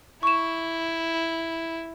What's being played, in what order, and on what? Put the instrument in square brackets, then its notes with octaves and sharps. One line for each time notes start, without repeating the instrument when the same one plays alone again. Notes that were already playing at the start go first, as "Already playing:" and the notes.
[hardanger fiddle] E4 [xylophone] C#6 E7